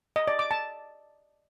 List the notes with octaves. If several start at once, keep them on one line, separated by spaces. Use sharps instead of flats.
D#5
D5
D6
A5